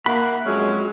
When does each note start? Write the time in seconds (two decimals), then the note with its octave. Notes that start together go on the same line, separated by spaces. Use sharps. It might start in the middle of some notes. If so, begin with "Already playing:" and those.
0.06 A#3 E5 F#5 B5
0.46 F2 F#3 G#3 C#4 F#4